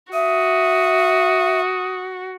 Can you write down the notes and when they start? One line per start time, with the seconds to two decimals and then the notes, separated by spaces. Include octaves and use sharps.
0.13 F#4 E5 D#6